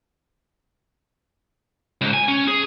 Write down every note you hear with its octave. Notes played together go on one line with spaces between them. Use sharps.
C#2 G#2
G#5
C#4
G#4